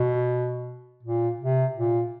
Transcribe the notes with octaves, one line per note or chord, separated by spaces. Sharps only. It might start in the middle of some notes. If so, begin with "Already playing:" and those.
Already playing: B2
A#2
C3
A#2